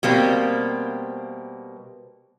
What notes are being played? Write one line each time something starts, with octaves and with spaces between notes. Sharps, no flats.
B2 G3 A#3 C4